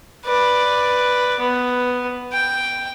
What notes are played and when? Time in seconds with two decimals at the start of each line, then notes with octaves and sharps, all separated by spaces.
0.25 B4 D5
1.39 B3
2.33 G5